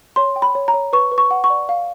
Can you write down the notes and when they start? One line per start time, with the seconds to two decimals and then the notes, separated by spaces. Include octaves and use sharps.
0.16 C#5 C6
0.36 G5
0.42 B5
0.55 C#5
0.68 A#5
0.74 C#5
0.93 B4 C#6
1.12 B4
1.18 C#6
1.31 F#5
1.44 C#6
1.50 D5
1.69 F5